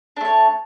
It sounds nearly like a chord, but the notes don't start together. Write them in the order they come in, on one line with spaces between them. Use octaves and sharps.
D4 A3 C#5